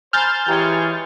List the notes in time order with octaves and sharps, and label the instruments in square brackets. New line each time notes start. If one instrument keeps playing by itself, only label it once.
[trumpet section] C5 [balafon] G#5 A#5 B5 [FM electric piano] F6 G6 A6
[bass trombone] E3 [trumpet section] G#3 F4 C#5 [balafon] G4 G5 A#5